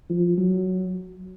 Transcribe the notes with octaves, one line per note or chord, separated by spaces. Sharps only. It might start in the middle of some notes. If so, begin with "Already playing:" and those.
F3
F#3